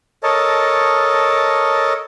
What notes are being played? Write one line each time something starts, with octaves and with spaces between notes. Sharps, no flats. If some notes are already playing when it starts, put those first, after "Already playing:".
A4 A#4 C#5 D#5 A5